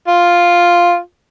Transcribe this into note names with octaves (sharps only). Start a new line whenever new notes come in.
F4